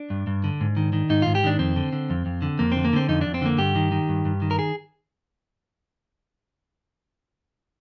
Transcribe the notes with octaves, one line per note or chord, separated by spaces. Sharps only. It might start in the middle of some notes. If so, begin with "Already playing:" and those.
Already playing: D4
G2
G2
D3
G#2
D#3
D#3
G#2 D#4
G#2 F4
G4
D#3 D4
F2 C4
D3
D3
F2
F2
D3
F2 A#3
D3 C4
A#3
D3 C4
F2 D#4
F2 D4
C4
D3 A#3
G2 G4
D#3
D#3
G2
G2
D#3
A#4
G#4